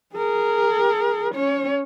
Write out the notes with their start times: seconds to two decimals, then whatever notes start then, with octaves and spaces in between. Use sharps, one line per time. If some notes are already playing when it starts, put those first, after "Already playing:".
0.15 G#4 A#4
1.34 C#4 C#5